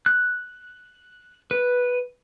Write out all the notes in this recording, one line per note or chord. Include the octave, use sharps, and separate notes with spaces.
F#6
B4